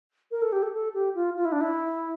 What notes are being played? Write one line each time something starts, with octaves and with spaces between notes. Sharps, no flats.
A#4
A4
G4
A4
A4
G4
F4
F4
E4
D4
E4